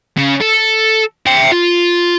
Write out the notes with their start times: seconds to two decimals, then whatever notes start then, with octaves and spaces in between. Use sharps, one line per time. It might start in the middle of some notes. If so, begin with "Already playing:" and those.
0.17 C#3
0.41 A4
1.26 E5 G5
1.52 F4